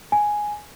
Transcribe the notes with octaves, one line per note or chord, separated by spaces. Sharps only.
G#5